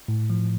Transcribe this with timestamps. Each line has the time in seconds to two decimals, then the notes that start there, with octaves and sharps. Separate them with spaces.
0.08 A2
0.30 F3